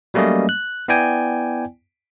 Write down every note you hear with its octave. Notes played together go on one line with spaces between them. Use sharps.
F#3 G3 A3 A#3 C#4 D#5
F#6
B3 E4 D5 G5 G#5